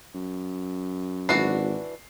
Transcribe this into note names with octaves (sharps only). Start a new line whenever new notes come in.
F#2
G#1 E3 D4 F#4 C7